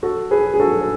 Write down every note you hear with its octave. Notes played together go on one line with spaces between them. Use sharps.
F#4 A4
G#4 B4
G#4
F#4 A4
A4